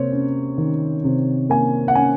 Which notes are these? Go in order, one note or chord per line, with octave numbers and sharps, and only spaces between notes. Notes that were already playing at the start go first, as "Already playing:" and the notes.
Already playing: C3 A#3 C5 C#5
C#4
D#3
C3
A#3 G#5
F#5
C#4 G#5